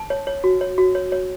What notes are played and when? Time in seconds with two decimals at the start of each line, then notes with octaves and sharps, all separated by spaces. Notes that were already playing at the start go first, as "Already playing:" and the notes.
Already playing: A5
0.10 C#5
0.27 C#5
0.44 F#4
0.61 C#5
0.78 F#4
0.95 C#5
1.12 C#5